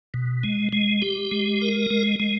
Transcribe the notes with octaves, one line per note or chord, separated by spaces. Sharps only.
B2
G#3
G#3
G4
G#3
A#4
G#3
G#3